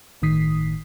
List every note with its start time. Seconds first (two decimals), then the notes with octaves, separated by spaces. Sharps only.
0.22 G1 A2 D#3 D#6 B6 C7